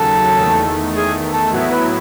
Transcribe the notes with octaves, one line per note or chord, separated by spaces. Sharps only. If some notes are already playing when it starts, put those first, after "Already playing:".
Already playing: D#2 C#3 F#3 A4
E2 D#3 A3
G#4
A4
A2 F#3 B3 E4
B4